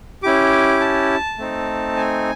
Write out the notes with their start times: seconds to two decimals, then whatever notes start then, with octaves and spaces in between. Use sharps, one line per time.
0.23 C#4 E4 G4 D6
0.80 A5
1.38 A3 C4 D#4
1.97 G#5